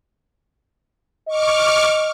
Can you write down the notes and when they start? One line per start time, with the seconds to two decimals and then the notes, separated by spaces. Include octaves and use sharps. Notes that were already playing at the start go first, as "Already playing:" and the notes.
1.28 D#5 C#6 D6 F6